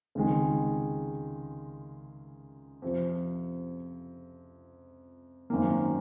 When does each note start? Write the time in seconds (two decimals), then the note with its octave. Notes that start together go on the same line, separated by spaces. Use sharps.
0.15 C#2 C3 D#3 G#3
2.82 F2 C3 F3
5.50 G#1 F#2 D#3 A#3